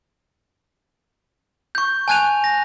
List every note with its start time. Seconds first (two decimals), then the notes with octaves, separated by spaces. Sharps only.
1.75 C#6 G6
2.08 G#5 A5 F#6 G#6 D#7 F7
2.44 A#6